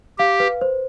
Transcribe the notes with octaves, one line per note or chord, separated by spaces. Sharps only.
G4 F5
B4
C5